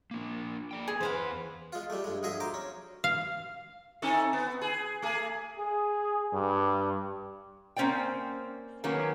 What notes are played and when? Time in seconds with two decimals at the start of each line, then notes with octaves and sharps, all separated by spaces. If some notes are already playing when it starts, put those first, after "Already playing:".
0.11 A#3 D4
0.71 A4 D5 G5
0.88 G#4
1.01 E2 E4 B4 C5 F5 F#5
1.73 G#3 F4
1.90 G3 A3
2.04 G2 G#3
2.23 D2 F3 G#4 D#5 E5
2.40 C5 A#5 C6 D6
2.54 C#4
3.04 F5
4.02 C4 D#4 A4
4.33 B3
4.62 G#4
5.02 A3 G#4
5.59 G#4
6.33 G2
7.76 A#3 C4 C#4 C5 D5 G5
8.84 D#3 F#3 A#3 B3 C#4